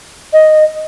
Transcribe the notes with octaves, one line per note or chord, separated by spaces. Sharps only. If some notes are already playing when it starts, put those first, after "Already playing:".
D#5